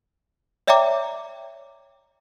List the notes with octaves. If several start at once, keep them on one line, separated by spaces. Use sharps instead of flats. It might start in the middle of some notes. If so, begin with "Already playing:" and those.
C#5 D5 E5 G5 A#5 D6